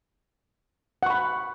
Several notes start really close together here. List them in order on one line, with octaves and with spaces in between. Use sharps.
F#5 C#6 B5